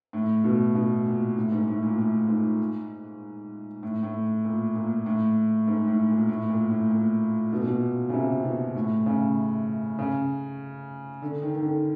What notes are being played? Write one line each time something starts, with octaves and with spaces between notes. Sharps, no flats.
A2
B2
B2
A#2
A2
G#2
A2
A#2
A2
G#2
A2
A2
A#2
A#2
A2
G#2
A2
A#2
A2
A#2
A2
A#2
B2
A#2
B2
C#3
C3
B2
A2
C#3
C#3
D3
D#3
D#3
D3